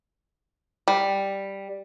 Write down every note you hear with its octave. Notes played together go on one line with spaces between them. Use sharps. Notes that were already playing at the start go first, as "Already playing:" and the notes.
G3